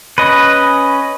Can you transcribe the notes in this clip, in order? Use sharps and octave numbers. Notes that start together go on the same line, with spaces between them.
C#4 B4 D#5